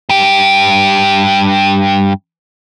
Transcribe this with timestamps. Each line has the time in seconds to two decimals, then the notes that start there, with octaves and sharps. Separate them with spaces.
0.09 G2 G4